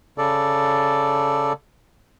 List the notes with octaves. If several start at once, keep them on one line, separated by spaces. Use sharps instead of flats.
C#3 A4 D5